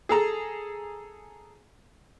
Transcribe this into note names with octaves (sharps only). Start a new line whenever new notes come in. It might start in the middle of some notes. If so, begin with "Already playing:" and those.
G#4 A4 A#5